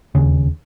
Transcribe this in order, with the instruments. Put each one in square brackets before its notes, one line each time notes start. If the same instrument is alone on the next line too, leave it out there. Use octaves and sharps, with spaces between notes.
[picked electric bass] E1 D#2 C#3